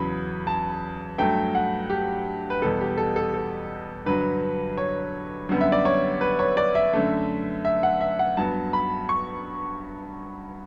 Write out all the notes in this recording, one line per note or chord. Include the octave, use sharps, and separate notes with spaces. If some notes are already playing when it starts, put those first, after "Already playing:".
Already playing: E2 C#3 F#3 B5
A5
G2 F#3 A3 G5
F#5
G4
B4
E2 B2 G3 B3 A4
G4
A4
A4
A4
G2 D3 F#3 B4
C#5
F#2 D3 G3 B3
E5
D5
C#5
B4
C#5
D5
E5
F#2 D3 A3
E5
F#5
E5
F#5
G2 F#3 B3 A5
B5
C#6